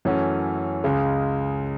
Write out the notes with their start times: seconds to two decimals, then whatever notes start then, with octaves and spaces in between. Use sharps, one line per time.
0.05 F#2 E3 A3 C#4 F#4
0.84 C#2 C#3 G#3